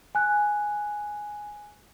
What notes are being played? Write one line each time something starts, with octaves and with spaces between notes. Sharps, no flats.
G#5 F#6